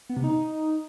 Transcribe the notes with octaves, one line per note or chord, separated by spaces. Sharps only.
B3
C3
D#4